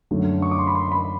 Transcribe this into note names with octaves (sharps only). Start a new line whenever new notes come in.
F#2 D3 F#3 A3
C#6
D6
C6
B5
C6
B5